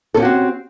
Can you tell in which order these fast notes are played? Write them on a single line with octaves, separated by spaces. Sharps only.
A4 C#4 G4 F#4 C4